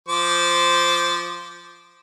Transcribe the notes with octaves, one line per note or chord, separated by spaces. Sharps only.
F3 C5 D6